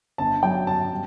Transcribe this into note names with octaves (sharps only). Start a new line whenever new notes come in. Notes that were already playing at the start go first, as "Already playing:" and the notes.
G1 A5
F#3 G5
G1 A5
G3